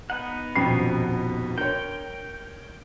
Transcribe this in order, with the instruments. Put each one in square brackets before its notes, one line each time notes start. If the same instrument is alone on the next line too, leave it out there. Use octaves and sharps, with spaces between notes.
[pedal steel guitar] B3 D#4 F#5
[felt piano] D#1 F2 B2 [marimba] C#4 G5
[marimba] D4 [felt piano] A#4 C#5 [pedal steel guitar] G5